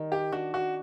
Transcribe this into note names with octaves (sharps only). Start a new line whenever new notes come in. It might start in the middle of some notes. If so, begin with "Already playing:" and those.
Already playing: D#3 G3
G4
D4 F#4
F#4